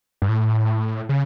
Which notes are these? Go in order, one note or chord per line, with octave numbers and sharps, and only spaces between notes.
G2
A2
C#3